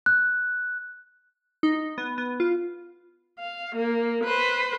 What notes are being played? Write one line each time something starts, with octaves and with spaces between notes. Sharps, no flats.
F#6
D#4
B3
B3
F4
F5
A#3
B4 C5